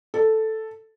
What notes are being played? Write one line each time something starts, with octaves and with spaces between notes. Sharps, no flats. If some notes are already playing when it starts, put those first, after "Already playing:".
A4